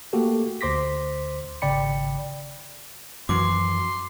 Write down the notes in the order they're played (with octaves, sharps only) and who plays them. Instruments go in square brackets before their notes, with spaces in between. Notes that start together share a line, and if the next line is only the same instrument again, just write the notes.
[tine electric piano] A3 A#3 F#4 G4 A4
D2 C5 C6 D6 A#6 B6
G#1 C#3 D5 G5 B5 C#7
[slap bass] F#2 [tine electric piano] E3 F3 F#4 [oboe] C6 [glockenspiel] D6